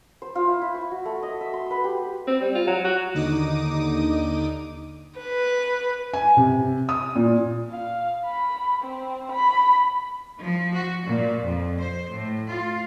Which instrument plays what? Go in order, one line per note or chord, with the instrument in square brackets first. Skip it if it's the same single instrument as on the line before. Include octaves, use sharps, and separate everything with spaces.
[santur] C5
F4
E4
E4
C#6
F#4
A3
D#5
E5
C6
B4
G4
[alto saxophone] C4
G3
F4
F#3
F#4
[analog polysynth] D#2 D3 D#4 D6 D#6 D#7
[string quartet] B4
[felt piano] G#5
C3
D#6
A#2
[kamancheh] F5
B5
C4
B5
[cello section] F3
F#4
A#2
F2
C5
A2
F4